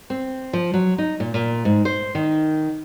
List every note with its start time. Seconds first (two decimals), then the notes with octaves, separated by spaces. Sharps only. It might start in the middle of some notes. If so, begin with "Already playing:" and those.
0.10 C4
0.53 F3
0.74 F#3
0.98 D#4
1.20 A#2
1.34 A#2
1.65 G#2
1.85 C5
2.15 D#3